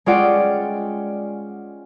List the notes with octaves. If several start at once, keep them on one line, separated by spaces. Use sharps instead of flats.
G#3 C#4 F4 D5 F#5 G5